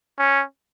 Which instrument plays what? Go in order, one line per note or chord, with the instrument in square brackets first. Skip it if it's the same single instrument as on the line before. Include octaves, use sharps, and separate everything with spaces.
[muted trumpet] C#4